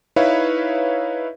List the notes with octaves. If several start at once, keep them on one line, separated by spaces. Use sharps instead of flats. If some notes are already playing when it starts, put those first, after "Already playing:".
D#4 E4 B4 C#5 E5 F5